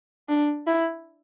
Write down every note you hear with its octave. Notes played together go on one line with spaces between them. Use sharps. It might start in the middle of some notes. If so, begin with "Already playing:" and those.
D4
E4